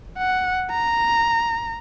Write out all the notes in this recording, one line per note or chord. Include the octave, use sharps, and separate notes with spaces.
F#5
A#5